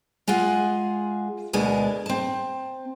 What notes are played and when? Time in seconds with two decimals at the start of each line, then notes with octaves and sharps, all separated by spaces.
0.28 G#3 F4 G#4 F#5
1.53 D2 B2 G#3 D4 A#4
2.06 C4 A5